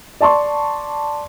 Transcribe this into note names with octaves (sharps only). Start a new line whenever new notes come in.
D5 A5 C6 C#6